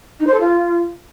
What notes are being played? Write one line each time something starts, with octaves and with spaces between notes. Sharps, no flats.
D#4
C5
A4
F4